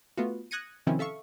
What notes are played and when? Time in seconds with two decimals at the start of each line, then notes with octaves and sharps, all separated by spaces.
0.18 A3 B3 F4 F#4
0.51 D#6 F#6 G#6 A#6 C#7 D#7
0.87 C3 D#3 F3 C4 C#4 E4
0.99 A4 E5 F5 C#6